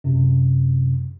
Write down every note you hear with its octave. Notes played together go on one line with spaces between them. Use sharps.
F#2 C3